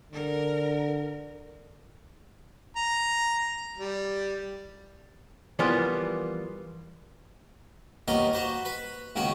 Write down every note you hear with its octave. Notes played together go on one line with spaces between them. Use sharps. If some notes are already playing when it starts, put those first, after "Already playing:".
D3 A#4
A#5
G3
E3 F3 G3 A#3 B3 F4
D#2 A#3 B3 A#4 C#5 D#5
F#4 B4 C5 A#5
B4 B5
C#2 D#3 A#3 B3 F#4 G#5